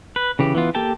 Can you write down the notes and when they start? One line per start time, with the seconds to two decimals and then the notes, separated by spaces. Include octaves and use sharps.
0.16 B4
0.39 C#3 E3 G4
0.55 E3 B3 F4
0.75 A#3 G4 A4 G5 A5